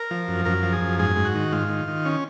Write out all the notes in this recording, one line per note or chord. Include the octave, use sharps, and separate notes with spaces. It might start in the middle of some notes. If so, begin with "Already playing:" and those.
Already playing: A#4
F3
F#2
F#2 A#4
F3
G#4
F#2
G#2 G#4
G#2
F#4
D#3
G#2 F4
D#3
D#3
C#4